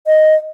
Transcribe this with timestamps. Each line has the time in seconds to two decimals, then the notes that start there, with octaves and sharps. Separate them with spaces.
0.07 D#5